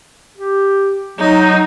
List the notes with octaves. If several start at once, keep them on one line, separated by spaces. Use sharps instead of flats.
G4
F#3 D#4